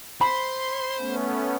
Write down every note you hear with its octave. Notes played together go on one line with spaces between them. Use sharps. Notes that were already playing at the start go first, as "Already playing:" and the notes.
C5 B5 C6
A3 B3 C#4